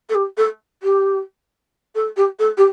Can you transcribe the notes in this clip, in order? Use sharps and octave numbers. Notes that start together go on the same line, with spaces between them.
A4
G4
A4
G4
A4
G4
A4
G4